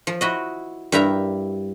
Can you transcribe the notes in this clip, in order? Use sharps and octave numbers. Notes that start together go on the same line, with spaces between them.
F3
E4 F#4 D#5
G2 E4 A#4 E5 A#5